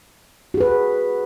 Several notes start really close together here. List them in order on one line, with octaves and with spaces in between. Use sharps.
F#4 G#4 B4